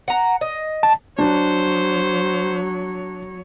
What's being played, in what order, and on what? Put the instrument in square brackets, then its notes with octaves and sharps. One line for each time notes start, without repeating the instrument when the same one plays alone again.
[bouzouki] F#5 A#5
D#5
[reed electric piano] A5
[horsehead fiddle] F#3 C#5 [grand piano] D4 [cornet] C5